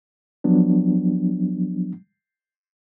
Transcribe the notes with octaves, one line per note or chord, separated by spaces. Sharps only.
F3 F#3 B3 D4